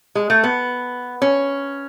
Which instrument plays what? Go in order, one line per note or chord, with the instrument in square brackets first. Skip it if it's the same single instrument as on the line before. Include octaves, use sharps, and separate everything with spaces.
[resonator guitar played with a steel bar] G#3
A3
B3
C#4